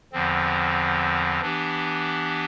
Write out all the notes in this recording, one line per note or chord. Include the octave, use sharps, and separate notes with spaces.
E2 D3 F3 C4
E3 B3 D4 G4